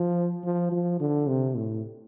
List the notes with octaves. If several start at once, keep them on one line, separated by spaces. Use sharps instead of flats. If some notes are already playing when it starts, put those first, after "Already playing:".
Already playing: F3
F3
F3
D3
C3
A2